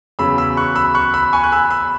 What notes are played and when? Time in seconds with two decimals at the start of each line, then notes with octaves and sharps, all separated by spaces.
0.19 E2 C#3 F#3 C#4 B5 E6
0.38 B5 E6
0.57 C#6 F#6
0.75 B5 E6
0.95 C#6 F#6
1.14 B5 E6
1.33 G#5 C#6
1.44 F#6
1.52 B5 E6
1.70 B5 E6